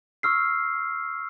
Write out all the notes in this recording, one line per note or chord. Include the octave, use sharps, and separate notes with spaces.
C#6 E6 F6 C7